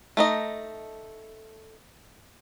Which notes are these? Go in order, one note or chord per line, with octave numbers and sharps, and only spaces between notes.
A3 D#4 D#5